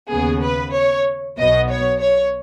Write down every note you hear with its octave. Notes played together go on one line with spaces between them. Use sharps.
D#2 C#3 B3 G#4
B4
C#5
B1 B2 B3 D#5
C#5
C#5